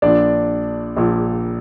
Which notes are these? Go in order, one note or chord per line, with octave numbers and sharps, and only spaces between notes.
A#1 A#2 D4 D5
A#1 A#2